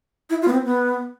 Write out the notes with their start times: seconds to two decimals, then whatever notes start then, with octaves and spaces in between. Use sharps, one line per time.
0.30 E4
0.42 F4
0.48 B3
0.52 C4
0.64 B3